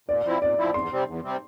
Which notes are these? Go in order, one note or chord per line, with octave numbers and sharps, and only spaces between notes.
A#2 D5
F3 C4 E4
A#2 D5
F3 C4 E4
E2 C6
C3 G3 C4
E2
C3 G3 C4